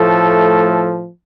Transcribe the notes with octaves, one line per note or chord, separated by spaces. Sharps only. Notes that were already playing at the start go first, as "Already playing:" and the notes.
Already playing: A2 F3 A3 A4